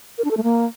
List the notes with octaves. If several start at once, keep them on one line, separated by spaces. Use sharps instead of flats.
A#4
D4
A4
A3
A#3